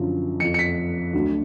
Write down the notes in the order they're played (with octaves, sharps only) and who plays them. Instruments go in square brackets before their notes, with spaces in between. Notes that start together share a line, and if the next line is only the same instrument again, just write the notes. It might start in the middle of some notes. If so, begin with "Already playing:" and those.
Already playing: [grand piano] F#2 D3 F3
F2 F3 C#7
C#7
B6
D2 D3 F#3